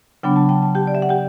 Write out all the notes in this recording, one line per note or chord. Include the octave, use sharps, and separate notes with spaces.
C#3 F#3 B3 D4 G5
A5
G5
A5
G4 G5
D5
E5
F#5
G4 G5